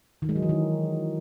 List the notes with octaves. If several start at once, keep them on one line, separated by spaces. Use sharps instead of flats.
D#3
G#3
F#3
E3
D#3